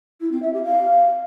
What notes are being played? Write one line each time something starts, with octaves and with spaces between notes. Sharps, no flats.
E4
C4
E5
G4
F5